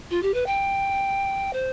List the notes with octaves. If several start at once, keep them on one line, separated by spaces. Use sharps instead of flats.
F4
G4
B4
G5
C5